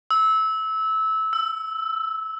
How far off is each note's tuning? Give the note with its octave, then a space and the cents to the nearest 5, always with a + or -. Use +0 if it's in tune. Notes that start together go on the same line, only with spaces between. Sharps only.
E6 -20
E6 +15